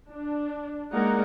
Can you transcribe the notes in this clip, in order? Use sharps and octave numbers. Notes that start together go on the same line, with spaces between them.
D4
G#3 A#3 D#4 A#4 D5 F#5